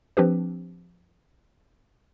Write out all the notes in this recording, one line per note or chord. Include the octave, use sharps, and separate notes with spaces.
F3 C4 D4 G4 B4